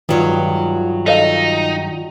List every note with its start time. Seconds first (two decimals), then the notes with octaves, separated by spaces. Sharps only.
0.09 G2 D#3 F#3 G#3 F4
1.06 D#4 A4 D#5 F5